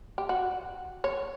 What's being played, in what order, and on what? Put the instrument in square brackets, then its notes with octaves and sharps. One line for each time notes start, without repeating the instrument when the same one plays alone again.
[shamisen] G4
F#4
C#5